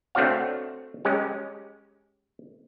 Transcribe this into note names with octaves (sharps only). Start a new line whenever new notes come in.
A3 C4 D4 F#4 C#5 F5
G#3 C#4 G4